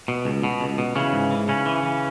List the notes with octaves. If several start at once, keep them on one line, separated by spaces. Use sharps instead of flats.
B2
C#2
B2
C#2
B2
C#3 E3 C#4
G#2
E3
C#3 E3 C#4
E3
E3